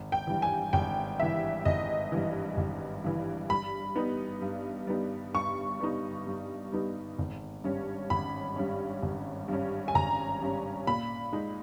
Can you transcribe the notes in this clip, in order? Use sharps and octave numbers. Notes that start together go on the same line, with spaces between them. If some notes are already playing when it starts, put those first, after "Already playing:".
Already playing: G#1
G5
G2 E3
G#5
G#1 G5
G2 E3 E5
G#1 D#5
G2 E3
G#1
G2 E3
G2 B5
G3 B3 D#4
G2
G3 B3 D#4
G2 C#6
G3 B3 D#4
G2
G3 B3 D#4
G#1
G2 G3 C#4
G#1 B5
G2 G3 C#4
G#1
G2 G3 C#4
G#5
G#1 A#5
G2 G3 C#4
A#2 B5
G#3 D#4